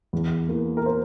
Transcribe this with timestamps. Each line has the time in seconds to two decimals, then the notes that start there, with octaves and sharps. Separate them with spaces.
0.13 E2
0.49 E3 A#3
0.77 A#4
0.86 C5